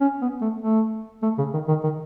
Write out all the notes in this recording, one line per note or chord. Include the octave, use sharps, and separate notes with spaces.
C#4
B3
A3
A3
A3
C#3
D#3
D#3
D#3